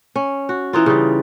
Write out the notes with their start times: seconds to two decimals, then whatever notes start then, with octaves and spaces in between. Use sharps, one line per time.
0.16 C#4
0.49 F#4
0.73 E3 D#4 F4
0.86 C#3 G3